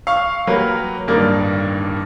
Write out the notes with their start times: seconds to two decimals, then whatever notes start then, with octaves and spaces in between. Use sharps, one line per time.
0.07 F5 C#6 F6
0.47 F#3 A#3 G4 B4
1.07 D1 G2 D#3 A#3 D5